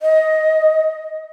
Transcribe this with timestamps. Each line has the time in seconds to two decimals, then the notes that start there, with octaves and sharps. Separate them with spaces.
0.02 D#5